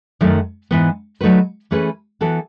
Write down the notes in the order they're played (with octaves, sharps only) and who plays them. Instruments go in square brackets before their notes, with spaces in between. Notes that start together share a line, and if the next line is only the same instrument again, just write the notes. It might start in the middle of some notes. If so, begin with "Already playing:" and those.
[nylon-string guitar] F#2 D#3 F#3 A3
G#2 E3 B3
F#3 A3 D#4 F#4 B4
E3 A3 C#4 G#4 B4
E3 B3 F#4 A4